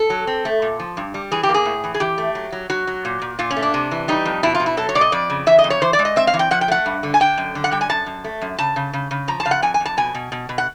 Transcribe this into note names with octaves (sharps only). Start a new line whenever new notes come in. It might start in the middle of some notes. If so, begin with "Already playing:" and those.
Already playing: A4
F#3
C4
A3
A#2
F3
G2
G3
E3 G#4
G4
A#3
G#4
A2
E3
G#4
E3 G4
A3
F#3
F#3
F#3 F#4
F#3
A#2
A#2
A#2 F4
C#4
A3
D4
C3
E3
G3 D#4
F2
B2 E4
F4
B2
E4
F#3 A4
C#5
B2 D5
D#5
F2 D5
C#3
E3 E5
D#5
F2
C#5
E3 C5
D5
G#3
D#5
C4 E5
F5
E3
G5
F3 F#5
G5
A3 F#5
G2
D3
G#5
D3 G5
F#2
D3
F#5
G3 G5
G#5
F#2 A5
F#2
A3
F#2
C#3 A5
C#3
C#3
C#3
F3 A#5
A5
C#3 F5
F#5
F2 G#5
G#5
F2
A5
B2 G#5
B2
B2
B2
F#5